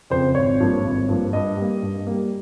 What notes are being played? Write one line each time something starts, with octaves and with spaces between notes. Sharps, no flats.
F2 C#3 C5
G#1 C#5
G2 F3 A#3
G#1
G2 F3 A#3
G2 D#5
G3 A#3
G2
G3 A#3